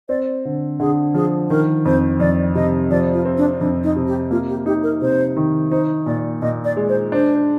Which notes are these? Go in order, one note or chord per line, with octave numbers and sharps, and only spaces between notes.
C4 D5
D3
D3 G#4
F3 G#4
D#3 A#4
F2 C5
F2 D5
C3 D#5
F3 D5
F4
C4
D4
F2 D4
D#4
C3
G4
A#3 F4
G4
D#4 G4
A#4
C3 C5
D#3
D#4 C5
A#2 D5
A#2 D#5
D5
G#3
C5
D4 C5